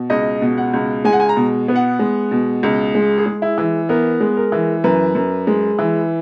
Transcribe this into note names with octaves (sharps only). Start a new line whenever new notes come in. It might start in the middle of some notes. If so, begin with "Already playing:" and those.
Already playing: B2
C#2 D#5
B2
F#5
C#2
G#3 G#5
F#5
G#5
A#5
B2
B3
F#5
G#3
B2
C#2
G#3
G#4
G#3
E4
E3
B3 A#4
G#3
A#4
E3
F#2 B4
F#2
G#3
E3